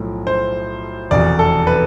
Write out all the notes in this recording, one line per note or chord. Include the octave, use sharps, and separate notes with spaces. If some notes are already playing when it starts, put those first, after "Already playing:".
Already playing: B1 A2 F3
C5
F1 E2 B2 D5
A4
B4